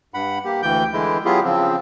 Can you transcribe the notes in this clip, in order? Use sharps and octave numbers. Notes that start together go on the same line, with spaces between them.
G2 F#5 B5
A#3 G4
D2 E3 G5 G6
D3 E3 G#3 E4
F#3 B3 E4 F4 G4 G#4
C#3 F3 C4